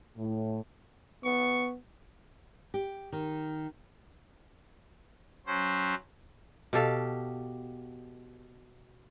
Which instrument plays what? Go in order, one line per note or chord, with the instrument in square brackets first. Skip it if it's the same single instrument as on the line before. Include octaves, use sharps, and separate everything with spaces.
[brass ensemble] A2
[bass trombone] B3 [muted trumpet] C#6
[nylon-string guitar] G4
D#3
[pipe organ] F#3 C#4 C5
[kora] B2 G4 A4 F5